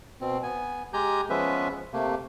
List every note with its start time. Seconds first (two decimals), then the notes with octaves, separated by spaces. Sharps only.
0.21 B2 C4
0.43 B3 G#5
0.93 G#3 G4 G#5 A#5 G6
1.30 F3 G#3 B3 C#4 B4 E5
1.93 C3 A3 A#3